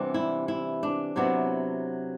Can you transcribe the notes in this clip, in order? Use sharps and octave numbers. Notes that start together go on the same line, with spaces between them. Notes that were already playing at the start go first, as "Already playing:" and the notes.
Already playing: C3 E3 G3 B3 D4
E4
E4
D4
C3 F#3 B3 D4 E4